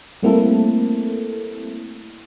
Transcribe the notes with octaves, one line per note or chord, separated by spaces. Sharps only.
G3 A3 A#3 C4 E4 A4